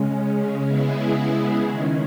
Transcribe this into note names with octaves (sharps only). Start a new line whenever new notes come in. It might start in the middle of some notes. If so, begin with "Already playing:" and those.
Already playing: C#3 G#3 C#4
C#3 G#3 B3 E4 G#4
D#3 G#3 C#4